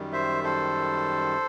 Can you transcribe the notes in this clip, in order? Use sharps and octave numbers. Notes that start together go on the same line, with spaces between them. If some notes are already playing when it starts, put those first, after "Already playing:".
Already playing: F#2 D#3 G3
C5 E5
A4 C5